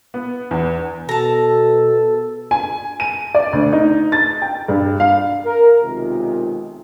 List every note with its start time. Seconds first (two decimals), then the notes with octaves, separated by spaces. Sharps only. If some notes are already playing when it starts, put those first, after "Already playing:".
0.14 B3
0.51 E2
1.09 B2 A4 A5 A#5
2.51 G#5
3.00 D#7
3.35 D5
3.53 D2
3.73 D#4
4.12 A6
4.42 G5
4.68 G2
5.00 F5
5.45 A#4
5.83 B1 C3 D#3 G#3 F4